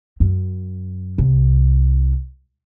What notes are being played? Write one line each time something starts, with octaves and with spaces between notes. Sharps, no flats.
F#2
C2